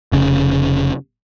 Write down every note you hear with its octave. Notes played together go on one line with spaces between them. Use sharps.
F1 C#3